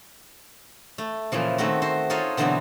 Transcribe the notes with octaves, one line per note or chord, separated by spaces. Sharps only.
A3
A#2 C#3 E3 F3
D#3 A3 C4 F#4
F#4 C5
D#4 F4 G#4 A4 C#5
B2 D3 E3 F#3 B3 C4